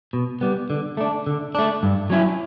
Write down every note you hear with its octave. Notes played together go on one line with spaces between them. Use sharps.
B2
G3 B3
D3
A3 D4
D3
A3 D4
G2
F#3 C#4 E4